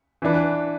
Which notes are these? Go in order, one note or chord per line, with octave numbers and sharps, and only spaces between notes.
E3 D4 B4